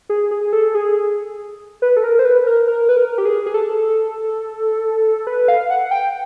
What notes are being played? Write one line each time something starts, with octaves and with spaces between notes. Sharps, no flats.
G#4
G#4
A4
G#4
B4
A4
A#4
C5
B4
A#4
A#4
B4
A#4
G4
G#4
G#4
A4
B4
F5
F#5
G5